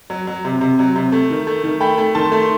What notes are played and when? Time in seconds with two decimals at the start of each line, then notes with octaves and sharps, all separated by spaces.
0.10 F#3
0.27 F#3
0.45 C3
0.61 C3
0.79 F#3
0.96 C3
1.12 A3
1.30 D#3
1.47 A3
1.64 D#3
1.81 A3 G5 B5
1.98 A3
2.15 D#3 A5 C6
2.32 A3
2.41 C6